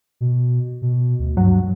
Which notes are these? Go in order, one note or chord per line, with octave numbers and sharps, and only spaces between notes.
B2
B2
D2
G2 F#3